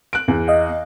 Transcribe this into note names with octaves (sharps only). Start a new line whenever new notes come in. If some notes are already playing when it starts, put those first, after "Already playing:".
F#6 D7
E2
D#5 F5